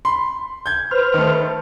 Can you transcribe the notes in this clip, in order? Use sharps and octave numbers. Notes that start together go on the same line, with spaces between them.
B5 C6
G6 G#6
B4 C5 F6
D#3 A3